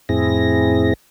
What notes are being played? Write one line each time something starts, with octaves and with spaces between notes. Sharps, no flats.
F2 A2 C4 E4 G#4 A#6